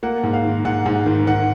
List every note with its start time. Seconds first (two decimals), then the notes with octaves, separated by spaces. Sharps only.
0.03 A#3 F#5
0.23 G#2
0.33 F5
0.45 D#3
0.65 G#2 F#5
0.86 G#2
1.06 D#3
1.27 D#3 F#5